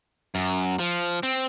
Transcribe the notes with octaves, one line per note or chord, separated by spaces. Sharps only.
F#2
F3
C4